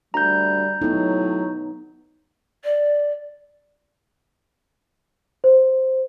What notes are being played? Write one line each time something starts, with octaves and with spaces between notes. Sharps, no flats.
D2 G3 A#5 G6
A2 F#3 B3 D#4
D5
C5